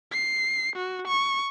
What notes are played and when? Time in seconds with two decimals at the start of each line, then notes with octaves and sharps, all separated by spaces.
0.11 C7
0.76 F#4
1.08 C#6